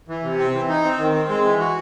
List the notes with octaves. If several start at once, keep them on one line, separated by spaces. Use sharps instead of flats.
E3
C3
C4
E3
D#4
C4
D#3
C4
G#3
E3
F#4